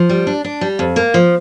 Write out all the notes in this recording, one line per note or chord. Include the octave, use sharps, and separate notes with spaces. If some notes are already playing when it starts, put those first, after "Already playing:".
Already playing: F3
G3
D4
D4
G3
F2
A#3
F3